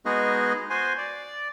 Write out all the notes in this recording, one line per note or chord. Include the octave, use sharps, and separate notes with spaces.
G#3 B3 D#4 F#4 G#4 D#5
F#4 C5 G#5 C6
D5